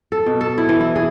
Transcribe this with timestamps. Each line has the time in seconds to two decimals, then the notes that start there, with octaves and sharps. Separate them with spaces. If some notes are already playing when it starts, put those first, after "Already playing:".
0.12 A4
0.26 B2
0.41 A4
0.58 E4
0.69 E3
0.81 E4
0.96 G#4